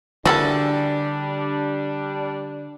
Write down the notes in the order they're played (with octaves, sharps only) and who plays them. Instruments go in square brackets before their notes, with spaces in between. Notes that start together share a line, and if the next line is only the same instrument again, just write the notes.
[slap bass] D3 [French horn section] G3 D4 [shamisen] A#3 E4 G#4 [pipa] F#4 A4